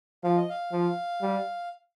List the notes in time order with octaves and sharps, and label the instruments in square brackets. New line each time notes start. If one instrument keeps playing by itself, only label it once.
[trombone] F3 [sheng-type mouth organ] F5
[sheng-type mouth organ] D#5
F5
[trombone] F3
G3